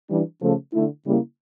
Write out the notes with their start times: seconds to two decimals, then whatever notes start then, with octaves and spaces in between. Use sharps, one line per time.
0.10 E3 G3 D4
0.42 C#3 F3 A3
0.73 D3 A3 E4
1.05 C#3 G3 A#3 E4